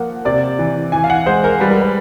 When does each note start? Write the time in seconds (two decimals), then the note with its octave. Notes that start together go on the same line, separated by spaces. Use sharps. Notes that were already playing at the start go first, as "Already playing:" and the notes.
Already playing: F3 A#3 F#5
0.25 C3 D5
0.59 E3
0.92 E3 G#5
1.04 F5
1.10 F#5
1.26 G#3 C5
1.44 A#4
1.60 G3 B4
1.70 A#4
1.81 B4